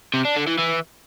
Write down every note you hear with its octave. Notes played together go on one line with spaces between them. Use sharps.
C3
D4
D3
E3
E3